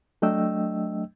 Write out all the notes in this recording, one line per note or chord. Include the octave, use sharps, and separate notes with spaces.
F#3 A3 D4 D#5 G5 E6